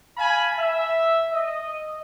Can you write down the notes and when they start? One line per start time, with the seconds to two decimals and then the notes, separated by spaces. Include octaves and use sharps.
0.17 F5 G#5 A5 B5
0.57 E5
1.32 D#5